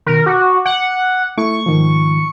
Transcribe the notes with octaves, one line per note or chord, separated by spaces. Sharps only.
B2 D#3 A#4
F#4 D6
F#5
A3 E4 C#6
G#2 D#3 F3